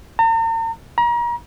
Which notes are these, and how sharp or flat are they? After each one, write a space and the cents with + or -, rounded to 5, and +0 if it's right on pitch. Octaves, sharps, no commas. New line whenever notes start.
A#5 -45
A#5 +35